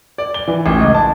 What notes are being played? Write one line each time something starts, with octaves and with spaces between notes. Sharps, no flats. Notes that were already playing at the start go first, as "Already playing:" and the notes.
D5
G7
E3
A1
C#2
A5